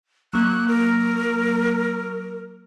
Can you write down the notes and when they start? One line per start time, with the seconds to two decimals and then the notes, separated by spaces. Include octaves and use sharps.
0.33 F#3 A#3 F#6
0.68 A#4